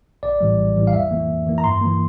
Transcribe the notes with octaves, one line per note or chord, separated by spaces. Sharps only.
A#1 D5
A2 E3 G3
A#1
A2 E3 G3
F5
F2 E5
E3 A#3
F2
E3 A#3
A#5
G2 C6
E3 A#3